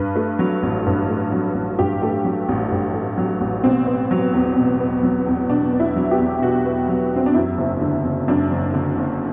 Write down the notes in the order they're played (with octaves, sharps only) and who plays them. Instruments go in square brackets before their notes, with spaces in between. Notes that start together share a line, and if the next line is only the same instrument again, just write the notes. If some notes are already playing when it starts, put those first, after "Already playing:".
Already playing: [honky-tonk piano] G2 B4
A3
F#3
A1
G2
A3
F#3
A1
G2 G4
A3
F#3
A1
G2
A3
F#3
A1
B2 C4
B3
F#3
E2
B2
B3
F#3
E2
B2 D4
B3
E4
F#3
G4
E2
B2 F#4
B3
F#3
E2 C4
D4
F#2 E4
F#1
D3
F#1
F#2 D4
F#1
D3
F#1